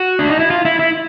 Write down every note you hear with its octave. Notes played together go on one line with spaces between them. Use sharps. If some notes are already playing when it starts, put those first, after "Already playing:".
Already playing: F#4
D4
D#4
E4
F4
E4
E4